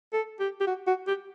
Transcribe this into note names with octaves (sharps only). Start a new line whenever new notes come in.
A4
G4
G4
F#4
F#4
G4